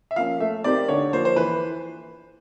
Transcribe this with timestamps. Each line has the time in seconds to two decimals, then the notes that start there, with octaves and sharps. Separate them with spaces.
0.11 E5
0.16 F3 A#3 C#4 F5
0.40 A3 E5
0.64 C4 D#4 G4 A#4 D5
0.88 D3 C#5
1.13 F3 A#3 C5
1.25 C5
1.36 E3 B4